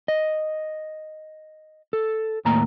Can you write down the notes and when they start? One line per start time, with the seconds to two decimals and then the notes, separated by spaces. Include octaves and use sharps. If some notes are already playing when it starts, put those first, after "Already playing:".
0.08 D#5
1.93 A4
2.45 D#2 A2 A#3 A#5